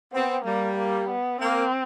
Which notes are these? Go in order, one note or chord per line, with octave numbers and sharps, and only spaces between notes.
B3 C4
G3 A#3
A#3
B3
A#3 C4